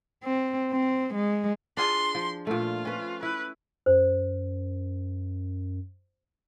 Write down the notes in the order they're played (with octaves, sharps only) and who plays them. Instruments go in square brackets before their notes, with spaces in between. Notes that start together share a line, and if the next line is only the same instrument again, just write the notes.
[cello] C4
C4
G#3
[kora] D4 F4 G#4 [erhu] C6
[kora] F3
[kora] A#2 A3 [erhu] F4
[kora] C#4 B4
[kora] E4 [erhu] B4
[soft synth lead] F#2 [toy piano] C5